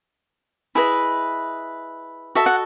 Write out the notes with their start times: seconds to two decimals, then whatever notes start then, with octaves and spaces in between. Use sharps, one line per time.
0.75 E4 G#4 B4 D#5 G#5
2.35 F#4 A4 D#5 E5
2.46 F#5